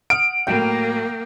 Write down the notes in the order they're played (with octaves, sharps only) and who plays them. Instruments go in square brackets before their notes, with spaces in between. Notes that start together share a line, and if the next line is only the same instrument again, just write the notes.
[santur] F#5 [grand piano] D#6 F6 [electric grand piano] D7
[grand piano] A2 F#3 [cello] A#3 [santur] G5